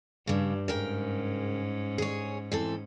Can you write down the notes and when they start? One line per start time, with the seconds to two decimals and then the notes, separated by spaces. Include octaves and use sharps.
0.27 G2 C#3 G3
0.68 G#2 C#3 C#4 A#4 G5
1.98 G#4 C#5
2.52 E3 C4 A4